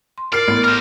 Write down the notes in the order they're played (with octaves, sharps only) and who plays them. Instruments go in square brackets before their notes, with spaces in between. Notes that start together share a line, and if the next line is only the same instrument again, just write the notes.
[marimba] C6
[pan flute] A#4 [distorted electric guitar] D5 [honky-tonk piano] F6 C7
[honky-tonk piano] A1 [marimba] B3
[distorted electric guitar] A#4 C5 [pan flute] F6